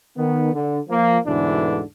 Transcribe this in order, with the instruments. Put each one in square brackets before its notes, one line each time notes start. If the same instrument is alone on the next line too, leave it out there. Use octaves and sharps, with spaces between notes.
[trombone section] D#3 B3
D3
F3 A#3
D2 G#2 B2 D3 E3 D4